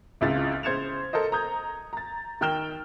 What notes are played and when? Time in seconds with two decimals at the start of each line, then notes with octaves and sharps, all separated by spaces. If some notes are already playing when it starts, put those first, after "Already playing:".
0.21 G#1 C#2 C#3 E4 F4 A6
0.63 C#3 C5 G#6 C#7 E7 F7
1.13 A4 A#4 C5 D#5
1.32 A#5 D#6 G6 G#6
1.93 A#5 A6
2.41 D#3 A#4 G5 F6 E7 G7